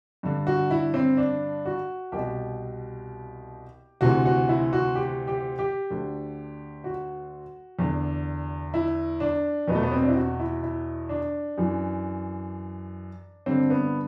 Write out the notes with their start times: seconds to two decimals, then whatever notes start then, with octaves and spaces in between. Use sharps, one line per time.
0.23 G2 D3
0.47 F#4
0.71 E4
0.94 C4
1.17 D4
1.65 F#4
2.12 C2 B2 G4
4.01 D2 C3 E3 F#4
4.25 F#4
4.49 E4
4.73 F#4
4.95 G4
5.27 G4
5.59 G4
5.90 D2 D3
6.84 F#4
7.79 E2 D3
8.74 E4
9.20 D4
9.68 E2 B2 B3
9.75 A3
9.83 B3
9.91 C4
10.02 D4
10.08 E4
10.15 F#4
10.40 E4
10.63 E4
11.09 D4
11.58 F#2 E3
13.46 G2 D3 C4
13.70 B3